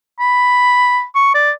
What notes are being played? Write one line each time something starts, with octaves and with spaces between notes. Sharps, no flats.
B5
C#6
D5